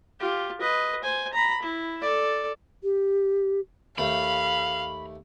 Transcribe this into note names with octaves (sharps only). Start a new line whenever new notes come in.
F4 G4
B4 D#5
C5 G#5
A#5 B5
E4
A4 D5
G4
D#2 A3 F5 B5